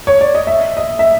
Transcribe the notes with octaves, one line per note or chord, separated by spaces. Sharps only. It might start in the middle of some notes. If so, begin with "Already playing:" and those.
C#5
D5
D#5
E5
D#5
E5